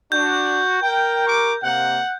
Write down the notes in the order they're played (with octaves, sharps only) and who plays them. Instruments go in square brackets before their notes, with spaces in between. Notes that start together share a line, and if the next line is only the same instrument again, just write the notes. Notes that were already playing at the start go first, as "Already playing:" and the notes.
[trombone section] D4 [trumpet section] F#4 [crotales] G6
[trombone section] A#4 [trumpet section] G5
[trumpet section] G4 C#6 D6
[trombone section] C3 A#3 [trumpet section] F#5